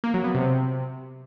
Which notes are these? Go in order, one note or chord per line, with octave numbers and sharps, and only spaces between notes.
A#3
F#3
B3
C3